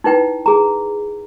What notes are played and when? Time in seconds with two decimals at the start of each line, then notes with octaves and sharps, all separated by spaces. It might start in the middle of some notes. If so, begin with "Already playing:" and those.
0.04 D#4 E4 B4 G5
0.46 G#4 A#5